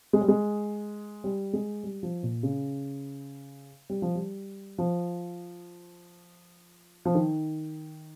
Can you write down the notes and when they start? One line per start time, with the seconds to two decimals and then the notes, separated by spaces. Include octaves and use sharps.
0.13 G#3
0.21 G3
0.28 G#3
1.24 G3
1.53 G#3
1.83 G3
2.03 F3
2.23 A#2
2.43 C#3
3.90 G3
4.02 F3
4.15 G3
4.78 F3
7.05 F3
7.15 D#3